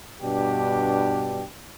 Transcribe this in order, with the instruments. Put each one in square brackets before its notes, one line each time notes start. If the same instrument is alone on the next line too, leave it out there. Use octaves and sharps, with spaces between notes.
[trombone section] G2 B2 D4 G4